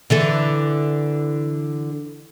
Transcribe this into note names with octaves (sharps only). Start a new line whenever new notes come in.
D3 E3 A4